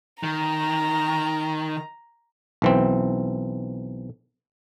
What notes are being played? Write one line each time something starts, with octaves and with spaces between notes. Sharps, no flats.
D#3 A#5
B1 E3 C4